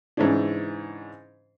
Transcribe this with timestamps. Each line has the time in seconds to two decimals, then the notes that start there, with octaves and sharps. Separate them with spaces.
0.17 G#2 C#3 E3 C#4 D4